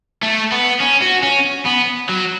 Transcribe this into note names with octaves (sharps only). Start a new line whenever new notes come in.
A3
B3
C#4
F#4
C#4
B3
F#3